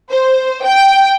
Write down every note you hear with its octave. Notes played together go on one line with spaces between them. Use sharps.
C5
G5